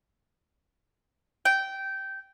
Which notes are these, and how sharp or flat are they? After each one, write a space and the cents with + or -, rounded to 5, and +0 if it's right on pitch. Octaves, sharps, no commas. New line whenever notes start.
G5 -15